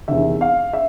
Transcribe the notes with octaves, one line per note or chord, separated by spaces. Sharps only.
E2 C3 D#3 E5
F5
E5